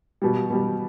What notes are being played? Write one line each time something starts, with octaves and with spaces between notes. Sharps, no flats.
B2 G3
B2 G3